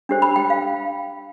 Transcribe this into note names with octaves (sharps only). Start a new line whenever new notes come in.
D4 G4 C5
B5
G5
F5